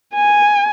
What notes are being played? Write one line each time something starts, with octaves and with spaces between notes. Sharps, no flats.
G#5